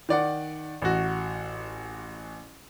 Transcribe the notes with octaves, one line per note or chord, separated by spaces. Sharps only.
D#3 D5 F#5
A1 F#4